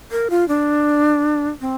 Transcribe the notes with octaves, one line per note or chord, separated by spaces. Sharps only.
A#4
F4
D4
C4